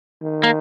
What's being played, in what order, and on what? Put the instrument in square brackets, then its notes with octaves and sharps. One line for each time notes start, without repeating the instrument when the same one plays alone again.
[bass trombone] D#3
[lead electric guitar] A#3